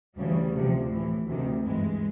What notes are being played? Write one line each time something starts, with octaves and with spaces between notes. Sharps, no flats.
D2 C#3 E3 G3
D2 C3 F3
A2 E3
D2 C3 D#3
G2 E3 G#3